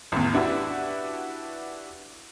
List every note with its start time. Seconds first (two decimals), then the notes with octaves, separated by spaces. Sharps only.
0.12 A1 E2
0.34 D4 E4 F#4 G4 B4